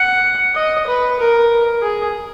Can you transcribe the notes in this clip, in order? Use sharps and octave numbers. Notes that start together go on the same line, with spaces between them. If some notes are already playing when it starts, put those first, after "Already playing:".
Already playing: F#5
D#5
B4
A#4
G#4